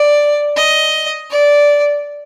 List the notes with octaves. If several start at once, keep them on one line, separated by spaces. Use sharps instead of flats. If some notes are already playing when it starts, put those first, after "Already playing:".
Already playing: D5
D#5
D5